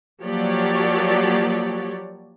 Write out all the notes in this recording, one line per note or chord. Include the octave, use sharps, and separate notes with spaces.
F3 F#3 A#3 G4 C#5 D5